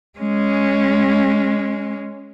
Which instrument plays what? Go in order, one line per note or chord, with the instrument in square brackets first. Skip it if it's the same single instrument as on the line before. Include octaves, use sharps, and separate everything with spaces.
[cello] G#3 C#4